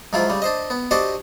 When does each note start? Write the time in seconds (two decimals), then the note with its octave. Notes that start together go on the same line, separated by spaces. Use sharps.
0.13 G#2 F3 F#3 E4 F4
0.30 C#3 G3
0.42 D4 C5 D#5
0.70 B3
0.91 D4 F#4 G4 C5 D5 D#5